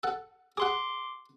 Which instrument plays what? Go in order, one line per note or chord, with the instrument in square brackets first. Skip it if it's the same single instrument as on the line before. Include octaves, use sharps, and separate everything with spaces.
[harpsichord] A4 F#5
[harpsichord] G#4 F#5 [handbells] C6 D6